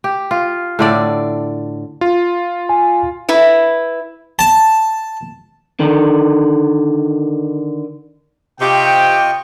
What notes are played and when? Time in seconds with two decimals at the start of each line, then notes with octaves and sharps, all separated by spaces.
0.04 G4
0.31 F4
0.79 A2 D3 D5
2.01 F4
2.69 G#5
3.29 E4 B4
4.39 A5
5.80 D3 D#3
8.61 C3 F4 G4 D#5 G5 C#6